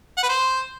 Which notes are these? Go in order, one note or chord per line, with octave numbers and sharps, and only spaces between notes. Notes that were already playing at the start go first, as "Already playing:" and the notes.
F#5
B4
C5